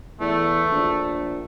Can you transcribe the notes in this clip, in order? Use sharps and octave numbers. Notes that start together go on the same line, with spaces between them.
E2 A3
A#1